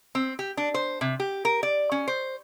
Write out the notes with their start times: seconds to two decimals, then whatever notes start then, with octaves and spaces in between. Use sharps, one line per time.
0.15 C4
0.39 G4
0.57 D4
0.74 C5
1.01 C3
1.20 G4
1.45 A#4
1.63 D5
1.92 C#4
2.08 C5